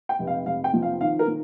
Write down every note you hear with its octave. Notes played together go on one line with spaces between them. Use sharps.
G5
F1
F5
F1 F5
G5
F3
F5
D#3 F5
A#4
D#3